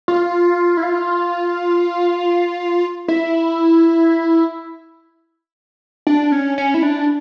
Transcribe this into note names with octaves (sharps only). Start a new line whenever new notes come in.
F4
E4
F4
E4
D4
C#4
C#4
E4
D4